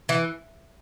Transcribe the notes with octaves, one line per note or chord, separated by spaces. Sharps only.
E3